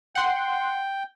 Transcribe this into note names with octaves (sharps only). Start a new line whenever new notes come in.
F#5 G5 C6